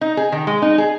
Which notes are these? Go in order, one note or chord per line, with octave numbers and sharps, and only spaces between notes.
D#4
G#4
D#3
G#3
D#4
G#4